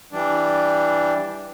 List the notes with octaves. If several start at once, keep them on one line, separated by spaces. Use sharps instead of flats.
E3 G3 D4